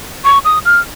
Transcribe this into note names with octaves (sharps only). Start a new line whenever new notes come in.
C#6
D#6
F6